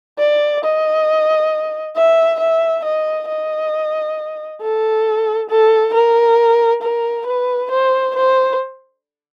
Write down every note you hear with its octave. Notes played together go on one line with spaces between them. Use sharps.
D5
D#5
E5
E5
D#5
D#5
A4
A4
A#4
A#4
B4
C5
C5